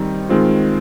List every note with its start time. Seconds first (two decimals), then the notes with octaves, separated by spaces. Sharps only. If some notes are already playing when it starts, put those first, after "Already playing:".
Already playing: D#3 G3 C4 D#4
0.29 D#3 G#3 C4 F4